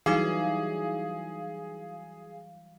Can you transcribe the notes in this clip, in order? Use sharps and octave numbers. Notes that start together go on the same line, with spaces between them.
E3 F#3 G3 D#4 G#4 F5 D6 C7